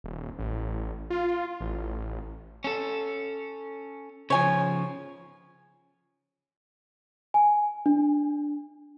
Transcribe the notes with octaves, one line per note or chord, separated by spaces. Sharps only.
D#1
A1
F4
A1
A1
C#4 A4
C#3 F3 C#5 G#5
G#5
D4